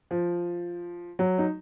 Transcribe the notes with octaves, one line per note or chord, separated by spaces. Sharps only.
F3
F#3
D#4